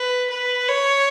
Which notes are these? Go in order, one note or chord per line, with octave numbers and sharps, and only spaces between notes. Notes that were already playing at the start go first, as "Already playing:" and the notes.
Already playing: B4
B4
C#5